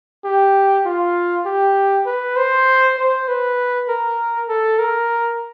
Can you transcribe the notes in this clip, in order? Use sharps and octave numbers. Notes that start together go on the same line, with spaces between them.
G4
F4
G4
B4
C5
C5
B4
A#4
A4
A#4